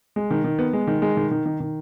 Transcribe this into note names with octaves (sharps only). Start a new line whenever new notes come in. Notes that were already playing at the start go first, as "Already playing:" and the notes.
G#3
D#3
D#3
B3
G#3
D#3
G#3
D#3
D#3
D#3
D#3